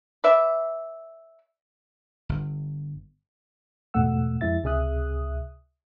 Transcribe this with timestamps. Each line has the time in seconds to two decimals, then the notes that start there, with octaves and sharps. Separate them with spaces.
0.24 B4 D5 E5
2.29 G1
3.94 E2 G#2 B2 A3 F#5 E6
4.41 F2 G#3 E4 E5 A6
4.64 C#2 C3 G#4 E5 D#6 F#6